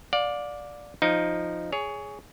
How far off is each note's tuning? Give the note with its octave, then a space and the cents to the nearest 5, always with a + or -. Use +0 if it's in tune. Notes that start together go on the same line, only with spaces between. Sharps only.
D5 +0 F5 +35
F3 +0 D#4 +0
G#4 +0 C#5 +20